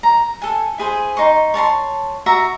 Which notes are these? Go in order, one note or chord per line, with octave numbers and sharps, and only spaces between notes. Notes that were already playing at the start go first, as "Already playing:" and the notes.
A#5
A4 G#5
E4 G#4 C5 G#5
D#4 C6 C#6
C#5 A5 A#5 C6
F#4 E5 A#5